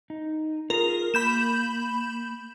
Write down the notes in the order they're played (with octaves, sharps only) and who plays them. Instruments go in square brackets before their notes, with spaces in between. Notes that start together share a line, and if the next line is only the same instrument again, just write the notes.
[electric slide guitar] D#4
[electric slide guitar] F4 G#4 [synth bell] A#4
[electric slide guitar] A#3 [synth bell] B5 G6 E7